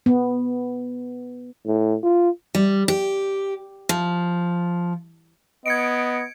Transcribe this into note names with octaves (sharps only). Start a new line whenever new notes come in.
B3
A2
F4
G3
G4
F3
B3 D#5 G#6 C#7 D7